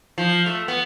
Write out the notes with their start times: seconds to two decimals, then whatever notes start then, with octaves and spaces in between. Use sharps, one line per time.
0.18 F3
0.46 A3
0.68 B3